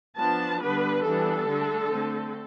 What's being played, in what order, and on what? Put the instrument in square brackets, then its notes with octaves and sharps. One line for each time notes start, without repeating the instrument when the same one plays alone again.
[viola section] F3 B3 D4 A5
D3 G3 B3 D4 B4
E3 G3 B3 D4 A4
D3 A3 D4
D3 A3 C4